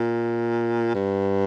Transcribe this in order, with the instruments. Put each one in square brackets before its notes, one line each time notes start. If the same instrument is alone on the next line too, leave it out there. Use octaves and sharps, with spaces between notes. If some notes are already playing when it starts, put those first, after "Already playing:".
Already playing: [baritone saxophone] A#2
G2